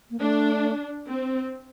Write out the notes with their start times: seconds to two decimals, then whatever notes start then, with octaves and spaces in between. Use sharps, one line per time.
0.11 A#3
0.20 A3 D4
1.08 C4